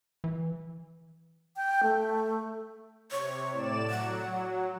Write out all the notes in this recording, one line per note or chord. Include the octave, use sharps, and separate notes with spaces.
E3
G5
A3
C3 C#5
A2 D5 E7
F#3 F#5